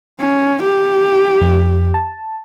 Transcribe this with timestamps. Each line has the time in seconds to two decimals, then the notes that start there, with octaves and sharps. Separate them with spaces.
0.20 C#4
0.63 G4
1.41 F2
1.94 A5